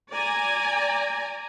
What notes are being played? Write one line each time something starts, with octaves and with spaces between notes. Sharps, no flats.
D5 G#5 A#5